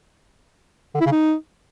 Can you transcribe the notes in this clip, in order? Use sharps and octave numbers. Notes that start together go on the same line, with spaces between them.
D3
E4
C#3
D#4